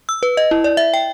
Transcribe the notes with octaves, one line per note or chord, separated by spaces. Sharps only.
E6
B4
D#5
E4
D5
E5
G5